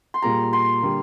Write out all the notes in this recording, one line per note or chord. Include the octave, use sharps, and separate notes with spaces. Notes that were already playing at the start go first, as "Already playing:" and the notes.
C6
A#2 G3 A#3 F4 G#4 A#5
C6
D3 G3 A#3